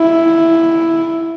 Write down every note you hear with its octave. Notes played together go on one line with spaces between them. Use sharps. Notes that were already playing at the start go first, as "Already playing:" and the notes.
Already playing: E4